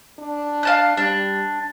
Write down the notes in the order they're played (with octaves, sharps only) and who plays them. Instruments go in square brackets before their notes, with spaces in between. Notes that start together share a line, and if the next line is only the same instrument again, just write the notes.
[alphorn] D4
[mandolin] F5 A5 F#6
[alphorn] G3 [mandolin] D4